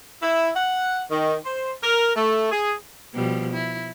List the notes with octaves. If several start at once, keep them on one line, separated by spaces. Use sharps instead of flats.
E4
F#5
D#3
C5
A#4
A3
G#4
B2 F3 G3
E4